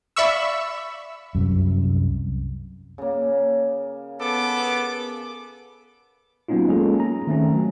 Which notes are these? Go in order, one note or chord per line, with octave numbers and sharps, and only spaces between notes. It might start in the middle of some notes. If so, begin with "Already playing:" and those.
D5 E5 F5 B5 C#6 E6
C2 F#2
C#3 A#3
B3 A4 D6
F#3 A#3 B3 C#4 D#4 F4
G#3 A#3 C#4 F4 G#4 A4
A#5
D#3 A3 C4 C#4
F#3